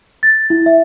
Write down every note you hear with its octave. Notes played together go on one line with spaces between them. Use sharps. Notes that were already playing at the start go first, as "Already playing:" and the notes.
A6
E4
E5